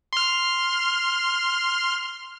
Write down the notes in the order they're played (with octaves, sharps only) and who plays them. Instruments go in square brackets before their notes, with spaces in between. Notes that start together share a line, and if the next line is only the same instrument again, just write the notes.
[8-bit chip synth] C6 F6